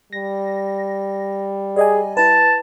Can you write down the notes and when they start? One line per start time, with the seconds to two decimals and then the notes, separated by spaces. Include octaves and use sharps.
0.13 G3 A#6
1.76 G#4 D5 D#5 G#5
2.17 E4 B4 A5